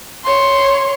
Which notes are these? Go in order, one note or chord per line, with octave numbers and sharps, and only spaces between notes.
C#5 C6